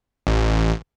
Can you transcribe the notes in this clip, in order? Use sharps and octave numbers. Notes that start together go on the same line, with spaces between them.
A1